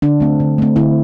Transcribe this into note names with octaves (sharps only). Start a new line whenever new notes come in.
D3 D4
A3 C4
D3
A3 C4
D3 C4 E4